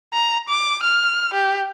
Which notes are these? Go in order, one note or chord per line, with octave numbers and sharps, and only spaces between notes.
A#5
D6
F6
G4